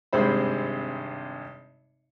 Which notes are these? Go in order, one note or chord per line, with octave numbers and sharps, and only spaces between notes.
G#1 G2 C3 G#3 C5 B5